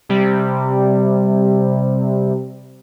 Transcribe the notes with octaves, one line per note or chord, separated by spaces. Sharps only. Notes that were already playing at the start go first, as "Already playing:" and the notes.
C3 G3